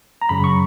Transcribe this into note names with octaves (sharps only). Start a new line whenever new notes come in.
A#5
F#2 C#3 F#3 B5
C#6